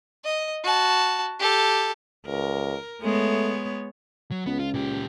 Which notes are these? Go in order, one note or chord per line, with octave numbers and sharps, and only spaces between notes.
D#5
F#4 A5
G4 A4
C#2 A#4
G#3 A3 B3 C#5
F#3
C#2 B3
F4
A#2 G4